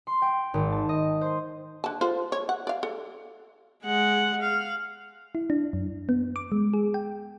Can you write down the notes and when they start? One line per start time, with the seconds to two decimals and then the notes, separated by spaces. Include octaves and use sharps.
0.07 C6
0.22 G5
0.54 G#1
0.72 A5
0.89 D#5
1.21 C5
1.84 D3 A5
2.01 F4 A4 C5
2.32 C#5
2.49 F#5
2.67 D5 F5
2.83 A4
3.84 G#3 F#5
4.43 F5
5.35 E4
5.50 D4
5.73 F#2
6.09 B3
6.36 D6
6.52 G#3
6.74 G#4
6.94 G5